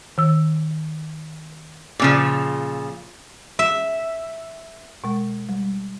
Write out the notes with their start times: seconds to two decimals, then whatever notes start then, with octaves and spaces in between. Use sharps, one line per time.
0.18 D#3 E6
2.00 A#2 C#3 F3
3.59 E5
5.04 B2 G#3
5.49 G3